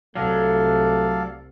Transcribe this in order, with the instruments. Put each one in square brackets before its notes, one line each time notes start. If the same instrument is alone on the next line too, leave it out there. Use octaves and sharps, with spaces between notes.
[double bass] C2 [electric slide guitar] F#3 [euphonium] A3 [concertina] A4 D5 F5